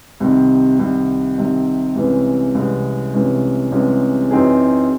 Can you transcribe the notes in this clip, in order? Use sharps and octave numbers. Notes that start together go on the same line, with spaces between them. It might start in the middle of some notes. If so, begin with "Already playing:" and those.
C2 C3 D#3
C2 C3 D#3
C2 C3 D#3
C2 C3 E3 G#3 C#4
C2 C3 E3 G#3 C#4
C2 C3 E3 G#3 C#4
C2 C3 E3 G#3 C#4
F#2 E3 C4 D#4 G#4